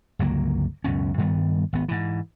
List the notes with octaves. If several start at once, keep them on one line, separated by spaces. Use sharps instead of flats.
G1 C#2 F#3 A#3
C#2 F#2 B2 C#4
G2 D#3 G3 B3
G#1 B3
G#2 E3